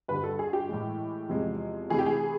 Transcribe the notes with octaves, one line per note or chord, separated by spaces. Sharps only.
G2 D3 G3 B4
A4
G#4
G4
A2 E3 G#3
E2 C3 F3 G#3
C3 E3 A3 G#4
G4
G#4